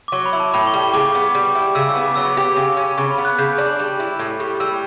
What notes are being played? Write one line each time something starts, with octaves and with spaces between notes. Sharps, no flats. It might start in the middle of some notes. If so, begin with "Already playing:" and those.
D6
F#3 C#6
B5
E4
A5
A2 B5
C#6
G3
C#6
C#3 D6
B3
G3
E4
C#3 E6
E6
B3
D6
F#3 E6
G4
C#3
C#4
C#3 C#6
B5
B3
F#6
C#3 G6
D4
G3
E4
A2
G3
G3 E6